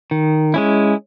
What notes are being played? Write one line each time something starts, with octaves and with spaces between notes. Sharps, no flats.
D#3
G#3 C#4 E4